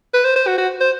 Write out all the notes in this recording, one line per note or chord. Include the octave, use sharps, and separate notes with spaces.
B4
C5
C5
F#4
F#4
C5